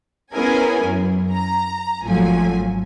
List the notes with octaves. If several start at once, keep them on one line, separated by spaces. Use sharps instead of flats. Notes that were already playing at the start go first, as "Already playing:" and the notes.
B3 C#4 E4 G#4 A#4 G#5
F#2
A#5
G#1 F#2 F3 F#3 A3 G#5